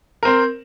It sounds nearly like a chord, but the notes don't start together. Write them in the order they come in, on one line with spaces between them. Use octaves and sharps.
A#4 C4 C5